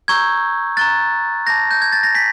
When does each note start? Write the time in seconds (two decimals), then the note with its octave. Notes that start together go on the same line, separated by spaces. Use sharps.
0.08 A#5 C#6 E6 G6 G#6
0.77 A#5 C#6 F#6 A6
1.46 A5 D6 G6 A#6
1.71 G6
1.82 G#6
1.93 A6
2.03 A#6
2.14 G#5 B6